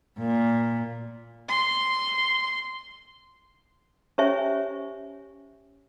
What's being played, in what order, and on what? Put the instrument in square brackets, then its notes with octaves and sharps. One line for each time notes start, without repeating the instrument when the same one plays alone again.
[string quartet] A#2
[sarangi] C6
[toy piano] C#4 G4 C5 C#5 E5 G#5